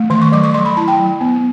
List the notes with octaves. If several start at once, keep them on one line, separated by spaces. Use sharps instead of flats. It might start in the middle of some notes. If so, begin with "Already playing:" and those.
Already playing: A3
D#3 C6
C#6
F#3 D6
C#6
F#3 C6
B5
E4 A5
G5
F#3
B3